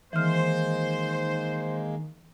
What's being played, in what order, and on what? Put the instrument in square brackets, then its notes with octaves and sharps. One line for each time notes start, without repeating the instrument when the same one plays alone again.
[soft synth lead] D#3 [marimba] E3 F6 [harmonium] G#3 A#3 [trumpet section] C5